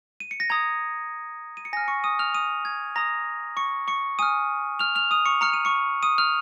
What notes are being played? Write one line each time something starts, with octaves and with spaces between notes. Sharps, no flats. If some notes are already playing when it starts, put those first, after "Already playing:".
D#7
C#7
A#6
A#5 D#6 G#6
D#7
C#7
G#5 F6 A#6
C#6 C#7
D#6 D#7
F6 F7
D#6 D#7
G#6
A#5 D#6 A#6
C#6 C#7
C#6 C#7
G#5 D#6 F6 D#7
F6 F7
F6 F7
D#6 D#7
C#6 C#7
A#5 F6 C#7
D#7
C#6 C#7
D#6 D#7
F6 F7